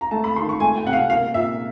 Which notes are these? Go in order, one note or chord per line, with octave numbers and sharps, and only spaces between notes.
A#5
A3 A5
B5
D#3 C6
C#6
A3 G#5
G5
C3 F#5
F5
A#3 F5
A#2 E5